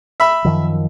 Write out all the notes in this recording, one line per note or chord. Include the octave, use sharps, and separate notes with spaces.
E5 B5
F#2 D#3 F3